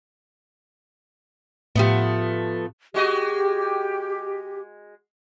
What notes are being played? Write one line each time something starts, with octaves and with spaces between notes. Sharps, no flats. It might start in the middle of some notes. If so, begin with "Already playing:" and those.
A2 F3 A3 B3 G4
G#3 F#4 G4 D#5